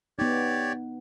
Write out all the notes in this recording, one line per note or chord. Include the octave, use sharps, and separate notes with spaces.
B3 D#4 G4 C#5 D5